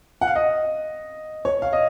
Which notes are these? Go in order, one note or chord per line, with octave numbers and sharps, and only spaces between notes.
F#5
F5
D#5
C#5
F5
D#5